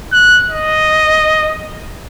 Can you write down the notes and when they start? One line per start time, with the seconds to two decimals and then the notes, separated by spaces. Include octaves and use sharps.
0.12 F#6
0.49 D#5